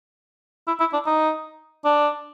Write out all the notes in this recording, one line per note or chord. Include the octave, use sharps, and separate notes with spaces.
E4
E4
D4
D#4
D4